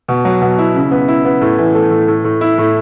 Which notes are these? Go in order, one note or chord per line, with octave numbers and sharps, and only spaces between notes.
B2
F#3
B2
E4
C#3
B3
E4
B3
A2
E3
A3
A2
A2
A2
E4
A2